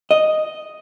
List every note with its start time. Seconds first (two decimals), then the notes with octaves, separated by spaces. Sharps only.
0.11 D#5